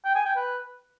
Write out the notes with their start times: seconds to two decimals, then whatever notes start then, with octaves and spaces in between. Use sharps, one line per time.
0.05 G5
0.15 G#5
0.25 G5
0.36 B4